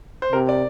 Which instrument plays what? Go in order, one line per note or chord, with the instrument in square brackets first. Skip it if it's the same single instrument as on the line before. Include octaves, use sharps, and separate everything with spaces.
[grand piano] C5
[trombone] C3 [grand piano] A#4
[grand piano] D5